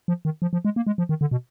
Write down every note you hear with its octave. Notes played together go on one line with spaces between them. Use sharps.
F3
D#3
F3
F3
G#3
A#3
G#3
F3
D#3
D3
B2